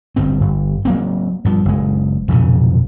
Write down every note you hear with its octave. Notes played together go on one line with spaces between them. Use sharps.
G1 G2 C4
G1
F#3 A#3 C4
G2 F3
F#1 G#3
B1 F2 A#2 C#3